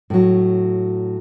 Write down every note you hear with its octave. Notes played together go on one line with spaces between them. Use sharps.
A2 F#3